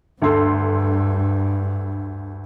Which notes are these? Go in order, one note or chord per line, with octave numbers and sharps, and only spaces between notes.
D2 G2 A4 C6